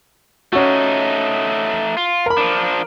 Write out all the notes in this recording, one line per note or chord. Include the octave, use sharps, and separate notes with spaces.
A3 C#4 D#4 F#4
F4
A#4 B5
F3 D4